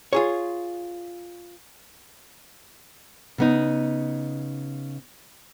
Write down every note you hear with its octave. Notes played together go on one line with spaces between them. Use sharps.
F4 G#4 C#5
C#3 B3 D#4